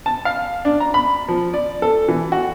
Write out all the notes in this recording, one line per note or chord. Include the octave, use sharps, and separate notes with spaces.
A5
F5
D4
A#5
B5
F3
D5
A4
E3
F#4